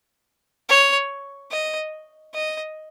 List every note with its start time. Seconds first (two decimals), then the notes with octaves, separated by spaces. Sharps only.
0.69 C#5
1.51 D#5
2.34 D#5